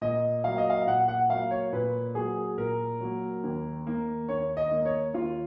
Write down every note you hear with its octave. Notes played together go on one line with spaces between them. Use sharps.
A#2 D#5
F#3 A#3 F5
D#5
F5
A#2 F#5
F#5
F#3 A#3 F5
C#5
A#2 B4
F#3 A#3 G#4
A#2 A#4
F#3 A#3
D#2
D#3 A#3
D#2 C#5
D#5
D#3 A#3
C#5
D#2 F4